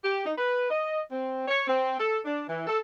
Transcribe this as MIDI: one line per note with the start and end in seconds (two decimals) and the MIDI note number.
0.03 0.24 67
0.24 0.32 63
0.37 0.68 71
0.70 0.99 75
1.11 1.47 60
1.48 1.61 73
1.68 1.94 60
1.99 2.19 69
2.25 2.42 62
2.48 2.66 52
2.67 2.78 69